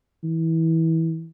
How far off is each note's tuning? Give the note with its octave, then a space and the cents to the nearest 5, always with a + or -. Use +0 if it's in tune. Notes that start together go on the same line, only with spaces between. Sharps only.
E3 -20